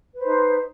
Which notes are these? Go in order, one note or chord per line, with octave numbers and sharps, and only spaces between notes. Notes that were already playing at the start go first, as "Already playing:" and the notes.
D#4 B4 C5